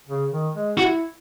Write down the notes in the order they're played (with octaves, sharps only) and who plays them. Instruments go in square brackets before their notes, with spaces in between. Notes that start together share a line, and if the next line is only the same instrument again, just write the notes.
[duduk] C#3
D#3
G#3
[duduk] E4 [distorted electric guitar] F#4